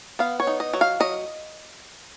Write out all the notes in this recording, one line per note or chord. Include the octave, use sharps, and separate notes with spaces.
B3 F5
C#5
D#4
D#5
F#3
F5
F#3 D#5